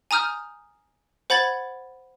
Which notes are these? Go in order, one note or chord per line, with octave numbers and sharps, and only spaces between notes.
G#5 A#5 D#6 F6 G6
C5 F#5 B5 G#6 A6